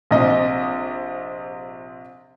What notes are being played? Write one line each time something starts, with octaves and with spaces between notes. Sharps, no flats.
A#1 C3 D#5